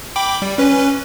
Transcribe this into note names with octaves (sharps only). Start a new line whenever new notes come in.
G5 B5 D6
G3
C#4 B4